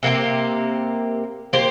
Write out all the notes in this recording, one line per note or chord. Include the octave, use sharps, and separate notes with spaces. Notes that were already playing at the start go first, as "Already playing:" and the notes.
C3 A#3 G4 C5
A#3 G4 C5